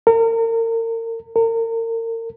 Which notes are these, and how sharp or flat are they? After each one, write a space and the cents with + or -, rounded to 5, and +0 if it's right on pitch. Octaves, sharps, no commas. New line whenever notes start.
A#4 -35
A#4 -35